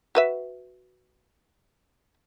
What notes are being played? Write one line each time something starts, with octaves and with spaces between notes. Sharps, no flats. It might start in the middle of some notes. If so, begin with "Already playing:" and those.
F#4 B4 E5